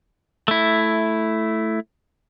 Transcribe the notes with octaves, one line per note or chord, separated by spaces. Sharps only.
A3 E4